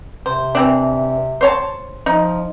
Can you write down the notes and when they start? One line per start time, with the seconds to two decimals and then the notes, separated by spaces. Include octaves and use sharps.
0.26 C3 C5
0.55 E3 C4 D4
1.41 C5 C#5 A5
2.06 F3 D#4